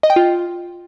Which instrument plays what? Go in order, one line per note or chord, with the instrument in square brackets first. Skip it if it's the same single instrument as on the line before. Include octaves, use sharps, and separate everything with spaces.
[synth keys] D#5
G5
F4